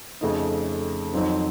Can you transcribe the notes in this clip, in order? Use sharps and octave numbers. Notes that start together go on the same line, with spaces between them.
F2 C#3 A3 D#4
F2 D#3 F#3 C4 D#4